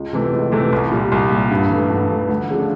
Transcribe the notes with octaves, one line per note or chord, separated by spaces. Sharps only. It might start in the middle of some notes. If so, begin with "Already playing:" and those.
Already playing: C#2
C3 E3 A3
C#2
C3 E3 A3
C2
A#2 G3
C2
A#2 G3
G2
E3 A3
G2
E3 A3
D2
C#3 F3 A3 D4